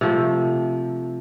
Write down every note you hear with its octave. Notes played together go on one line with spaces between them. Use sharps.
C3 F3 A3